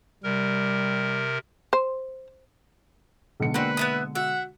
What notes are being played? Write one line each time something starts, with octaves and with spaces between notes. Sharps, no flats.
C3 G3 A#4
C5
B1 B2 D3 G#3 C#7
A#3 C4 D4 F#4 B4
B3 E5 D#6
F#4 E5 F#5